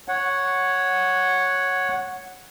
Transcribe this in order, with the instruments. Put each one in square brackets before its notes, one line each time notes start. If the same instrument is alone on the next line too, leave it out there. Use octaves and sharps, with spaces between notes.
[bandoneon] C#5 F#5